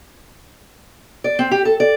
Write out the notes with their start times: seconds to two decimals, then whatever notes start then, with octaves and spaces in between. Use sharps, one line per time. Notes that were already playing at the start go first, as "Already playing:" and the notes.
1.24 D5
1.39 C4
1.51 G4
1.65 A4
1.80 D5